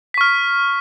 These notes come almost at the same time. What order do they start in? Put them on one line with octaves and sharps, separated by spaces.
B6 C#6 F6